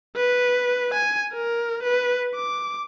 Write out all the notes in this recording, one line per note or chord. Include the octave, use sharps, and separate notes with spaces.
B4
G#5
A#4
B4
D6